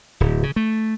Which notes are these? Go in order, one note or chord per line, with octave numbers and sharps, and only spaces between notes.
D1
C#3
A3